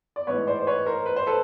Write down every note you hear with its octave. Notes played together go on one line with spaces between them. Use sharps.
D5
A1 G#2 E3 B4 C#5
C5 D5
C5
B4 C#5
A#4 C5
B4
C5
A4 B4